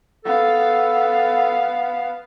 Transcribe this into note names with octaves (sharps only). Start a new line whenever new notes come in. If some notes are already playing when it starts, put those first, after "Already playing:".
B3 A4 F5